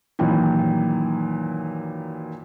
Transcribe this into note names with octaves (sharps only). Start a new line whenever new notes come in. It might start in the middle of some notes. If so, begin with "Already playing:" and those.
F#2 A#2 D#3 E3